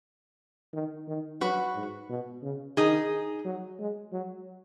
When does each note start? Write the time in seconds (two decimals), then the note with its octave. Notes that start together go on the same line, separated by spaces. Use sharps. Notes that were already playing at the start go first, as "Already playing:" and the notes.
0.73 D#3
1.08 D#3
1.41 F#3 F#4 B4
1.76 G#2
2.09 B2
2.43 C#3
2.77 D#3 D#4 G#4
3.45 F#3
3.79 G#3
4.12 F#3